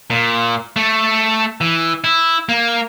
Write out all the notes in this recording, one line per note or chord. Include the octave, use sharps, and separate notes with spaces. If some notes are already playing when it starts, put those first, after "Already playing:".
A#2
A3
E3
E4
A#3